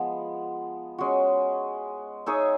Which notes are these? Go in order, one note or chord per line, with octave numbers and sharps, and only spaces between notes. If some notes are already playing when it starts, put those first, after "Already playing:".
Already playing: F3 G#3 B3
G#3 C#4 F#4
D#4 G#4 C#5 E5